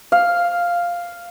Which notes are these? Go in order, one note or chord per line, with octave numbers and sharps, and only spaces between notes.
F5